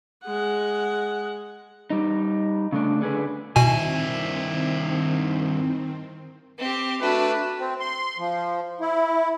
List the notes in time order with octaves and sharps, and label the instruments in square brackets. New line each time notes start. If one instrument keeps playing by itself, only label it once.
[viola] G#3 F#5
[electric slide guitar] G3 D#4
C#3 A3 D4
D3 G#4 B4
[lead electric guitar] G2 E4 [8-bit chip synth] B2 G#5 [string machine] D#3 C4
[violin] C4 G4
[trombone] A3 [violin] D4 [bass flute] F#4 [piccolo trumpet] B4
[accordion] C4
C6
F3
E4